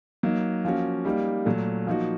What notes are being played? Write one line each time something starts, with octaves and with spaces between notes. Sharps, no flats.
F#3 A#3 D#4
F3 A#3 C#4 F#4
G3 A#3 D#4
A#2 F#3 A3
F3 A#3 D#4 F#4